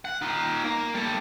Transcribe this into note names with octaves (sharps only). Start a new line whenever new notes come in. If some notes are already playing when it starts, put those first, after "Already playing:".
F#5
D#4 F4
A#3
G3 A4